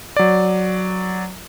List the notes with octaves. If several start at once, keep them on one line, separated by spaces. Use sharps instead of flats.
F#3 D5